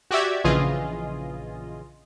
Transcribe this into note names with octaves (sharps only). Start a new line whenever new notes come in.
F#4 G4 D5 E5 G#6
A#1 C#3 E3 F4 G#4 D#5